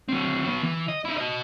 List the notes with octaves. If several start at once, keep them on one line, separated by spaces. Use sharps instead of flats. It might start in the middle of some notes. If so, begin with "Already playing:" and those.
F#3 C4
F#3 B3
E3
D#5
D#4 E4
F#4 D#5